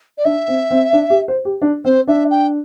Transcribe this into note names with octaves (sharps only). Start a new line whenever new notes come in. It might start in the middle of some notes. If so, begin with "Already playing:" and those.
D5
D4 E5
C4
C4
D4
G4
C5
G4
D4
C4 C5
D4 E5
G5